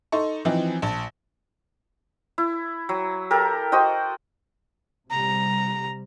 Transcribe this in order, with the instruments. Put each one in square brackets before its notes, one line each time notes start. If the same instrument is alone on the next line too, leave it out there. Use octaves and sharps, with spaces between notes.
[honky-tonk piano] D#4 A4 C6 C#6
E3 F3 C4 D#4
A#1 A5
[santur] E4
F#3
G4 A4 A#4
F#4 C5 D#5 G5
[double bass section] C3 G3 [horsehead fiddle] A#5